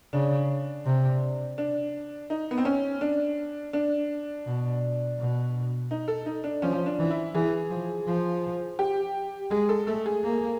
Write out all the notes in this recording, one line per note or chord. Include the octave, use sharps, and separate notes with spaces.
C#3 D4
C3
D4
D#4
B3
C4
C#4
D4
D4
B2
B2
D#4
A4
D#4
D4
F3 C#4
D4
E3
E4
E3 G#4
F3
F3
G4
G#3 G#4
A4
A3 A4
G#4
A#3